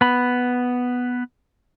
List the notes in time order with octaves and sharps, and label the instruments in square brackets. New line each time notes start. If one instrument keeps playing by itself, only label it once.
[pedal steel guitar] B3 B5